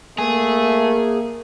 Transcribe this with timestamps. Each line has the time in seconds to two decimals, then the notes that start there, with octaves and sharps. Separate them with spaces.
0.19 A3 A#3 G#4